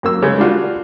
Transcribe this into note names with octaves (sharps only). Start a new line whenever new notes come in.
F#2 A#3 E6
C#3 G#3
G3 D4 F4 F#4